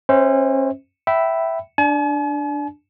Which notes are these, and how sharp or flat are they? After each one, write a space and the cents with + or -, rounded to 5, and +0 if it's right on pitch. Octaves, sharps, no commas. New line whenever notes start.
C#4 -35 C5 -15 E5 -35
E5 +0 G5 -25 B5 +0
D4 +0 G#5 +45